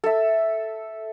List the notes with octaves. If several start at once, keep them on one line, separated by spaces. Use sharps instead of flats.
A4 E5